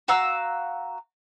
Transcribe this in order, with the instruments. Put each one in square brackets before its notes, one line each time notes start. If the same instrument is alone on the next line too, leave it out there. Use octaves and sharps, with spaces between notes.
[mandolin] F#4 F5 A#5 E6